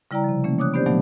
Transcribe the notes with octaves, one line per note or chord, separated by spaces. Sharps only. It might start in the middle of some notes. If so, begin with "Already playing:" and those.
C#3 G3 E4 D5 G5 A#5
C3 F3
E3 A3 A#3 C#4
C#5 D6 D#6 F#6
B3 D4 G4 C5 D5 G6
A#2 D#3 F3 F#3 A3 B3